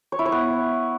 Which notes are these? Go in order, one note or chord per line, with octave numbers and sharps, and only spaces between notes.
C#5
E4
C#5
B3